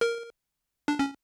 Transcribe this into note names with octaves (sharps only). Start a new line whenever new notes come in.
A#4
D4
C#4